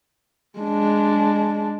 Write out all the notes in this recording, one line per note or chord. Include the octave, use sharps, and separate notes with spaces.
G#3 D4